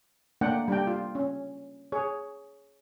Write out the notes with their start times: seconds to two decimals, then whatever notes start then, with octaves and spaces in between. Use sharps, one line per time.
0.41 A3 A#3 D4 F#5 G5
0.68 G3 D4 G5
0.87 F4
1.15 C#4
1.92 G#4 C#5